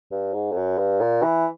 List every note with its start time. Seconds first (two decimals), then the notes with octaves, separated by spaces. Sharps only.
0.12 G2
0.34 G#2
0.52 F2
0.57 F#2
0.78 G2
1.00 A#2
1.23 E3